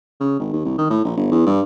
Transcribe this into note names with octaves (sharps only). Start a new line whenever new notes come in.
C#3
G#1
D#2
C2
D#3
A2
A#1
G1
E2
G2